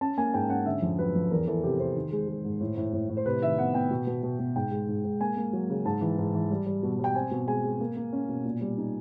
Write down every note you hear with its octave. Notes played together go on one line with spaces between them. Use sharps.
C#4 A5
A#3 G#5
G#2 G5
C#4 F#5
D3 E5
F2
F#3 B4
F2
E2 A#4
E3 A4
C3 G4
C3 C5
D#3
G#3
G#3
G#2
A2
A2
A2
A2
C5
C3 B4
D#3 E5
B3 F#5
B3 G5
B2
B2
B2
B2
G#2 G5
G#3
G#2
G#2
A#3 G#5
A#3
F#3
C#3
G#2 A5
E3
G#2
E3
G3
G3
B2
G3 G5
C4 G#5
B2
G#3 G#5
G#3
A#3
A#3
C#4
B2
A#2
G3
D#4